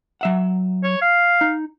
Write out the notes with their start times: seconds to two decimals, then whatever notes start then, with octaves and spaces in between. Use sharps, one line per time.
0.21 F#3 E5 F#5
0.84 C#5
1.02 F5
1.41 D#4